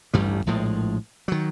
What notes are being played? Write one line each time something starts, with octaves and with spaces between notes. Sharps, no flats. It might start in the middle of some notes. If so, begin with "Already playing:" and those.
A1 D2 G2 G3
A#1 A2 F3 G#3
D#3 F#3